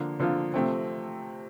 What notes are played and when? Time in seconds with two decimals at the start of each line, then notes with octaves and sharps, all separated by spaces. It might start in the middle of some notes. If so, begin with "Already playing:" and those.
Already playing: D3 F3 A#3 F4
0.19 D3 F3 A#3 F4
0.54 C3 F3 A3 C4